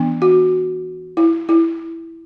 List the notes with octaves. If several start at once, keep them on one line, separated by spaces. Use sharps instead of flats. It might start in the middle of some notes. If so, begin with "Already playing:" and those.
Already playing: E3 B3 D4
F#4
E4
E4